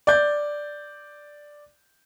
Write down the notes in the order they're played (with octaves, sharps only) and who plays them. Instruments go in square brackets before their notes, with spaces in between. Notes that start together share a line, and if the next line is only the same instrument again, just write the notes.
[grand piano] D5 G6